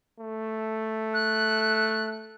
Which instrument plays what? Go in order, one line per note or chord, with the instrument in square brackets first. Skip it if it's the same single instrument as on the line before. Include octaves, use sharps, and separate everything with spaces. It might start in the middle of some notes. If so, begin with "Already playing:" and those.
[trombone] A3
[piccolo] F#6